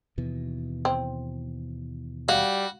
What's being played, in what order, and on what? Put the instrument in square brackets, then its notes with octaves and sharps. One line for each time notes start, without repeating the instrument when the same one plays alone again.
[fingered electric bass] D#2 B2 E3
[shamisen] C4
[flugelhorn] G3 [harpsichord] F#4 [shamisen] F5